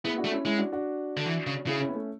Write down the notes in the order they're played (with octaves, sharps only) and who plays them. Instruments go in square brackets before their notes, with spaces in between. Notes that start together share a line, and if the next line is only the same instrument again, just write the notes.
[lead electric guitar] B3 [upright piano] E4 G#4
[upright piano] D4 F#4
[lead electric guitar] A3
[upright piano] C#4 E4
[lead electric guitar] G#3 [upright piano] C#4 E4
[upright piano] D4 F#4
D4 F#4
[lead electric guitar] D3
E3
C#3
[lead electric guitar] C#3 [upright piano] E4 G#4
[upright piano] C#4 E4
B3
A3 C#4